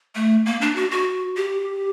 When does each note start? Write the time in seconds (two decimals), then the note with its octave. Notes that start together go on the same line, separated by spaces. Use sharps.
0.15 A3
0.46 A#3
0.61 D4
0.76 F#4
0.91 F#4
1.36 G4